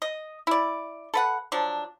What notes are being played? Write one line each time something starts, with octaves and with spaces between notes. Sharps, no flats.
D#5
E4 D5
A4 B4 F#5
F3 F#3 D4